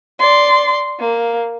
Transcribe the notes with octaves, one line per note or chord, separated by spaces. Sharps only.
D5 C6
A#3